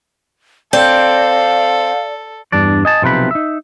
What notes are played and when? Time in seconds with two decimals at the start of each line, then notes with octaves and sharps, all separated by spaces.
0.73 C4 A4 D5 F5
2.52 E2 G2 D4 D5
2.85 D#5 G#5 A5
3.02 B1 C3 F3 B4 B5
3.31 D#4 E5